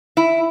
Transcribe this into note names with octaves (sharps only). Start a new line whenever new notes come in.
E4